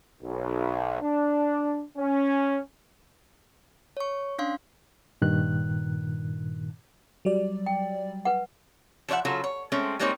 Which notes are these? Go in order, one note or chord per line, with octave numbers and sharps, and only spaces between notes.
B1
D4
C#4
C#5 C#6
C#4 D4 F5 C6
G2 A#2 D#3 F#6
F#3 G3 D5
G5
B4 F#5
F3 G#4 C#5 E5 F#5
C#3 F#3 F4 A4
C#5
G#3 A3 C4 C#4
G3 G#3 A#3 C4 D#4 C#5